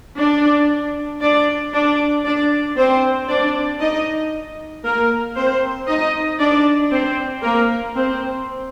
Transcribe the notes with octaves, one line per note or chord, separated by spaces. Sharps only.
D4 D5
D4 D5
D4 D5
D4 D5
C4 C5
D4 D5
D#4 D#5
A#3 A#4
C4 C5
D#4 D#5
D4 D5
C4 C5
A#3 A#4
C4 C5